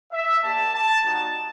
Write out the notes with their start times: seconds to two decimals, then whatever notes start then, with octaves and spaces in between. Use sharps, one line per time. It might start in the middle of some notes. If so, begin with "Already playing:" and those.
0.12 E5
0.42 A#3 D4 G4 A5
0.73 A5
1.05 G3 B3 D#4 F#4 A5